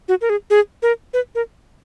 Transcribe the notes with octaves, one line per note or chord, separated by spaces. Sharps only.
F#4
A#4
G#4
G#4
A#4
B4
A#4